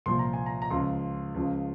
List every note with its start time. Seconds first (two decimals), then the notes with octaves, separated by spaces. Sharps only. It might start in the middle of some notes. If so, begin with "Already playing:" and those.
0.06 C2 A#2 F3 C6
0.19 A#5
0.33 G#5
0.46 A#5
0.62 A#5
0.70 C#2 C#3 F3 C6
1.34 C#2 C#3 F3